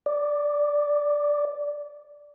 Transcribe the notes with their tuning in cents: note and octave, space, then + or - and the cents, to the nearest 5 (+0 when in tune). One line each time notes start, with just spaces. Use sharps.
D5 -5